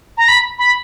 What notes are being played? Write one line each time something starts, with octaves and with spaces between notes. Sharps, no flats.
A#5
B5
B5